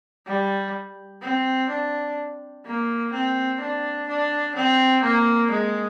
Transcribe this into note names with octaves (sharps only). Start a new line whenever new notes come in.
G3
C4
D4
A#3
C4
D4
D4
C4
A#3
G#3